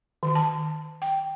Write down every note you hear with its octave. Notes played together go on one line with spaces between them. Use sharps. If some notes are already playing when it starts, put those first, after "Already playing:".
D#3
A5
G5